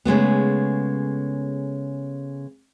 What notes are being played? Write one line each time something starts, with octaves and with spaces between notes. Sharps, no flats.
C#3 G#3 A3 B3